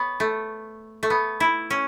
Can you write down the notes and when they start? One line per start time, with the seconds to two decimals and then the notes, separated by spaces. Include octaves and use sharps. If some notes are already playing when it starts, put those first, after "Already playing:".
Already playing: B3 C#5
0.20 A3
1.03 A3
1.10 B3
1.40 E4
1.70 C#4